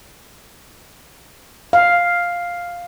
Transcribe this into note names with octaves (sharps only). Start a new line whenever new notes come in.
F5